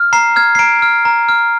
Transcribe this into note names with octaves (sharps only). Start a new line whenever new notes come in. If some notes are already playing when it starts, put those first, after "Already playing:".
Already playing: F6
A#5 C7
F6 G#6
C7
A#5 D7
F6
A#5
F6